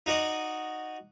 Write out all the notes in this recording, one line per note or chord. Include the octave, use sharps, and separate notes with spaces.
D#4 F#4 D5 D#5